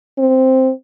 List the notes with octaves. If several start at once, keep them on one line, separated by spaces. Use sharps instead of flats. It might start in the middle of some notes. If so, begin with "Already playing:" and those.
C4